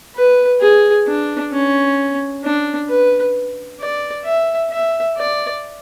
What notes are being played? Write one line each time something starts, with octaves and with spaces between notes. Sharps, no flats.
B4
G#4
D4
C#4
D4
B4
D5
E5
E5
D5